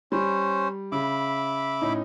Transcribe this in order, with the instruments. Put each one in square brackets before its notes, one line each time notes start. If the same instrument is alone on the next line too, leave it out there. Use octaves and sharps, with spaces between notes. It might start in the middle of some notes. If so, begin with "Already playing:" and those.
[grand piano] G3 [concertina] C#4 C5
[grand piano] C#3 [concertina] E5 B5 D6
[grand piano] A2 C#4 D#4